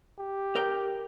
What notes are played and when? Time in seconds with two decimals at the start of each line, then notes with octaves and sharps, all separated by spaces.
0.19 G4
0.55 A#4 G5